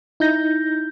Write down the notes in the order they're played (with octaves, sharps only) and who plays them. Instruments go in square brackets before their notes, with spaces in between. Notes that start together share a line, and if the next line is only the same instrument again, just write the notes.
[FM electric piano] D#4 E4 G6 A#6